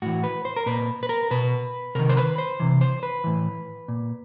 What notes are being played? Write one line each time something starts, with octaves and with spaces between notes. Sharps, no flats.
A2 E3 F#4
B4
C5
A#4
A#2 B4
B4
A#4
B2 B4
C3 D#3 A#4
C5
B4
C5
C3 E3
C5
B4
A2 E3
A#2